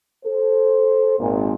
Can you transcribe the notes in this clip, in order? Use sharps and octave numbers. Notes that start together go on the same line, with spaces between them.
A4 C5
G#1 A#2